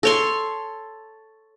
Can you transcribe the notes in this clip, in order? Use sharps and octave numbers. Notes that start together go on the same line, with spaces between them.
A4 C#5 C6